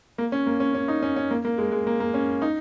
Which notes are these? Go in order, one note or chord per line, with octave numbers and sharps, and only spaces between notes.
A#3
C#4
A#3
C#4
C#4
D#4
C#4
C#4
A#3
A#3
G#3
G#3
A#3
A#3
C#4
D#4